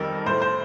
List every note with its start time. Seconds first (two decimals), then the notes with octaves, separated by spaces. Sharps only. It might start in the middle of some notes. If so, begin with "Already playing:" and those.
Already playing: F2 D#3 G3 A4 A#4
0.26 A2 A3 C5
0.42 C5